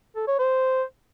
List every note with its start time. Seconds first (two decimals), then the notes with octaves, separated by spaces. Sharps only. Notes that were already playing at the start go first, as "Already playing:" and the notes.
0.16 A4
0.27 C#5
0.39 C5